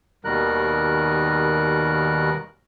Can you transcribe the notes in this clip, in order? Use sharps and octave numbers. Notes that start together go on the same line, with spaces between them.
D#2 B2 D#3 G3 A#4 F#6